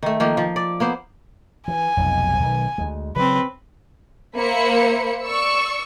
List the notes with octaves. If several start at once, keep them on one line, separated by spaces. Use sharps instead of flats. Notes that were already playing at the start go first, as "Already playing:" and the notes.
D#3 A3
D#3 F3 A#3
F3
D5
A#3 B3 C5
E3 G#5
F1 B1 F2
B1 D#3
D2 G#3
C#3 F#3 C4 B4
A#3 C5 E5 B5 C#7
D5 C#6 E6 C#7